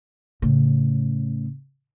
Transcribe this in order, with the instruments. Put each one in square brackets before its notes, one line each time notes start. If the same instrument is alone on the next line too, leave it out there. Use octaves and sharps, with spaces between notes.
[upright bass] A2 C#3